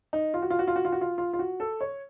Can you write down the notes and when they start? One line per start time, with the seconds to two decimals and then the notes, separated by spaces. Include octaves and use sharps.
0.13 D#4
0.34 F4
0.42 F#4
0.50 F4
0.59 F#4
0.68 F4
0.76 F#4
0.85 F4
0.92 F#4
1.01 F4
1.18 F4
1.33 F4
1.39 F#4
1.60 A4
1.81 C#5